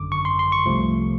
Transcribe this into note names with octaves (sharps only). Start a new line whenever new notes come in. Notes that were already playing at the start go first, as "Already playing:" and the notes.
Already playing: G#1 F#2 D3 D6
C#6
C6
C6
C#6
C2 C3 F3 A3